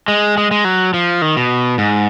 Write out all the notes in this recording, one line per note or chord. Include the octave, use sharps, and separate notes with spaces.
G#3
G#3
G#3
F#3
F3
D#3
B2
G#2